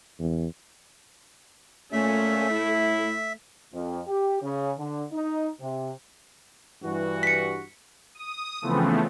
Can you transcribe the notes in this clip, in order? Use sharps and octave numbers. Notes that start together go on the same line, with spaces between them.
E2
A#2 A3 C#4 E5
A2 E4
F2
G4
C#3
D3
D#4
C3
G2 E3 F#4
B6 C#7
D#6
C#3 E3 F3 A3 B3 C4